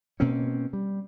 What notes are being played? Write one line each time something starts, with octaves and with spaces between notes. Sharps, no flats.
B2 A#3 C4 C#4
G3